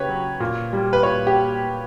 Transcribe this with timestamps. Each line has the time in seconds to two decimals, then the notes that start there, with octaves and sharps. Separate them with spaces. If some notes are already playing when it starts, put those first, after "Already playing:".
Already playing: C#3 G4 B4 C#5
0.09 F#3
0.40 A#2
0.73 G3
0.93 B4
1.03 A#2 C#5
1.27 G4